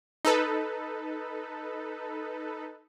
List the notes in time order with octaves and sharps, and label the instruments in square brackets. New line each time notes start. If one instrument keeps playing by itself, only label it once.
[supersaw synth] D#4 A4 B4